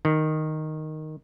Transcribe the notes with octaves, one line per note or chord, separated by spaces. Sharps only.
D#3